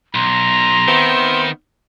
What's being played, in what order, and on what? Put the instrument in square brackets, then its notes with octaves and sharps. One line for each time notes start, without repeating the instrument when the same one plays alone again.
[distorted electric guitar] B1 [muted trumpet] A#5 [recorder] C6
[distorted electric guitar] D#3 [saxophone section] B3 C4 E5